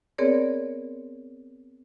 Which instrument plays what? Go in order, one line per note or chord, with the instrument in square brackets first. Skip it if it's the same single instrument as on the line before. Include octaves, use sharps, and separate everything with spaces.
[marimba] B3 C4 G#4 A#4 C#5 D5